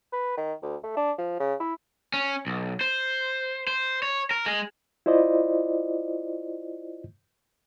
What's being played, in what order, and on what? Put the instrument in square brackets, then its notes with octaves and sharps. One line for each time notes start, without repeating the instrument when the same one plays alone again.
[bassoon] B4
D#3
D2
A3
D4
F3
C#3
E4
[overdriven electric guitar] C#4
B1
C5
C5
C#5
A#4
G#3
[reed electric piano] E4 F4 C5 D5 D#5